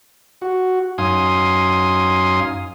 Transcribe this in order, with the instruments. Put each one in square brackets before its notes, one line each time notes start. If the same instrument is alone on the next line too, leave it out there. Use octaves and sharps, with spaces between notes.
[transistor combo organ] F#4
F#2 D#4 F5 G#5 C6 D#6